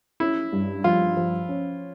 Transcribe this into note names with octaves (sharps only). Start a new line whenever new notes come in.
C#4 E4
G2
F3 F4
F3
C#4